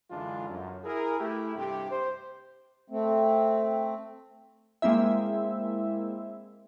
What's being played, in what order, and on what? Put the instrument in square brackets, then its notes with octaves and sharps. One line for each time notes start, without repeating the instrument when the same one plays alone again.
[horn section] F#2 D3 E3 G#3 D4 F4
F#2
E4 G#4 A#4
A3 E4 G4
G2 C3 G4
C5
[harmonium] A3 C4
[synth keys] G#3 A#3 C4 E4 E5